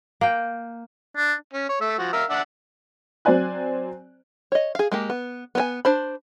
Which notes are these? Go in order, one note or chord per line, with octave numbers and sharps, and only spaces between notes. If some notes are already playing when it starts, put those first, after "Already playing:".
A#3 G5
D4
C#4
C#5
A3 E5
F3 F#4
A#4 E5 F5
D4 E5 F#5
F#3 C4 C5 D5 G#5 F#6
C#5 D#5
G#4 F5
G#3 A#3 G4
B3
B3 A#4 G#5
D4 C5 B5